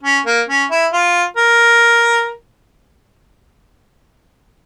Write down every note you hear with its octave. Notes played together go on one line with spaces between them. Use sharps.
C#4
A#3
C#4
E4
F4
A#4